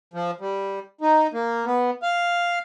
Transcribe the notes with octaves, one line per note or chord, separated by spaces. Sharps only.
F3
G3
D#4
A#3
B3
F5